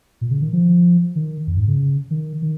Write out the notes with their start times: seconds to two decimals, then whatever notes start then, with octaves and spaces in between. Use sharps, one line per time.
0.21 A#2
0.31 C#3
0.42 D#3
0.53 F3
1.16 D#3
1.47 F2
1.57 G#2
1.68 C#3
2.11 D#3
2.42 D#3